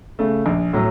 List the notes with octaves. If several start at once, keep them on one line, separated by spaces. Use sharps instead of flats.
C#3 A3
A#1
A2 F#3